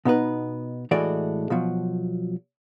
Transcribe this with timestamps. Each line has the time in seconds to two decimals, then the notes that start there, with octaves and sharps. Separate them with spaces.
0.05 B2 B3 D#4 B4
0.91 A2 E3 G#3 F#4 A4 D5
1.50 B2 F3 F#3